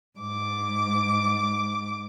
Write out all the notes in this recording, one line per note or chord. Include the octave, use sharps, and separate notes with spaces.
G#2 D6